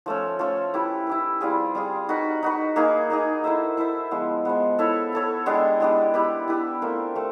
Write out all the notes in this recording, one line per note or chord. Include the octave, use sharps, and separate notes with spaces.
F3 A3 C#4
F3 A3 C#4
E4 G4 B4
E4 G4 B4
G3 C4 F4 G#4
G3 C4 F4 G#4
D#4 F#4 B4
D#4 F#4 B4
A#3 D#4 G#4
A#3 D#4 G#4
E4 A4 C5 E5
E4 A4 C5 E5
F3 G#3 B3
F3 G#3 B3
E4 A4 C#5
E4 A4 C#5
G#3 B3 D4 G4
G#3 B3 D4 G4
E4 G4 B4
E4 G4 B4
A3 C4 F4 A#4
A3 C4